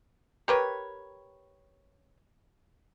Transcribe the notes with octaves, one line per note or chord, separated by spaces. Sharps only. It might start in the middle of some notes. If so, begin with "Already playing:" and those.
G4 A#4 B4 C#5